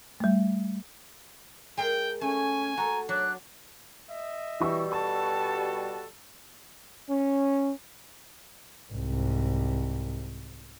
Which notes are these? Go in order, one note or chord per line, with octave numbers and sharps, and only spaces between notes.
G3 A3
G#3 G#4 A#4 G5
A3 C#4 G#5
F#4 A4 A#5
F#3 D4 F#6
D#5 E5
B2 E3 G3 C#6 E6
F#4 A4 A5 C#6
C#4
C2 G#2